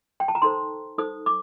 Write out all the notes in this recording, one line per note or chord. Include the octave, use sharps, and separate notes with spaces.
G5
A5
A#5
D#4 A4 C5 C6
D#4 A4 C5 D#6
D6